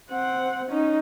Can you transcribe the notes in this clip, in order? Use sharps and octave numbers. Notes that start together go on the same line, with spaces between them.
C4 F#5
C#4 D#4